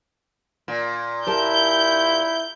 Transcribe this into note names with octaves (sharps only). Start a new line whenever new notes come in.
A#2
E4 G4 A#4 A5 G6